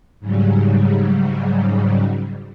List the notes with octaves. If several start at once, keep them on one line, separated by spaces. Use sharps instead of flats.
G#2 C#3 F#3 G3